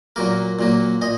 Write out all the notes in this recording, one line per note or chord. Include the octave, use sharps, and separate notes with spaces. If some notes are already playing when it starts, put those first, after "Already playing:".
A#2 F#3 A#3 A#4
A#2 F#3 A#3
A#2 D#5